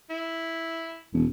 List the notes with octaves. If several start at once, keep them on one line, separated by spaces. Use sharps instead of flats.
E4
E1